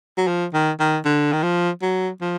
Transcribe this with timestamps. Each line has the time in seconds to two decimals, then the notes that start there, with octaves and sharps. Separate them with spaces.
0.18 F#3
0.28 F3
0.54 D#3
0.80 D#3
1.05 D3
1.33 D#3
1.43 F3
1.82 F#3
2.21 F3